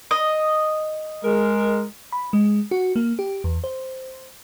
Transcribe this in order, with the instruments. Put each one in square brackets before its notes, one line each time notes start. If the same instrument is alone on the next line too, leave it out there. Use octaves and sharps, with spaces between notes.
[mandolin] D#5
[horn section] G#3 A#4
[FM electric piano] B5
G#3
F#4
A#3
G4
E2
C5